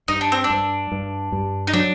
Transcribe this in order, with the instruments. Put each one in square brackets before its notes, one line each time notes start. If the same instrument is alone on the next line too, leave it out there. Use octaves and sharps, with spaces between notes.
[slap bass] G2 [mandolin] D#4
[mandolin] D4
C4
D4
[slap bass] G2
G2
G2
[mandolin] D#4
[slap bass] F#3 [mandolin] D4